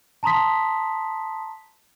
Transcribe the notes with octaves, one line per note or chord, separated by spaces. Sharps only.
A5 A#5 C6 D#6 B6